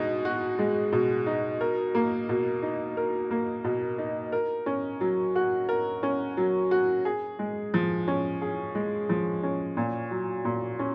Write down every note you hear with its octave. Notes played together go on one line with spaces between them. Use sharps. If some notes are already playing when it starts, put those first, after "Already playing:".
Already playing: B2 G#3 D#4
F#4
G#3
B2
D#4
A#4
A#3
B2
D#4
A#4
A#3
B2
D#4
A#4
C#4
F#3
F#4
A#4
C#4
F#3
F#4
G#4
G#3
F3
C#4
G#4
G#3
F3
C#4
A#2
F#3
A#2
C#4